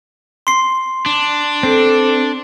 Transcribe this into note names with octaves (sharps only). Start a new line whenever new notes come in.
C6 C7
D4
C4 A4